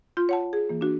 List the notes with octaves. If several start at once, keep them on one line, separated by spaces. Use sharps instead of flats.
F4 C6 G6
C#5 F#5 A5
G#4
E3 A#3
D4 F#4